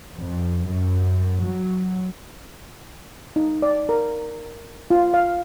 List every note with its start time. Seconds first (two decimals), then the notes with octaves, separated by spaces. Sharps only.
0.17 F2
0.68 F#2
1.42 F#3
3.36 D#4
3.62 D5
3.89 A#4
4.91 F4
5.14 F5